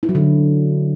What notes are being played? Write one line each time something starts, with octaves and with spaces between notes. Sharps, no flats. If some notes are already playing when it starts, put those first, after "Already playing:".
E4
F#3
D3